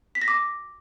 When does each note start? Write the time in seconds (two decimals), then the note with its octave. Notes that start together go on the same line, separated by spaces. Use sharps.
0.15 B6
0.22 A#6
0.28 D6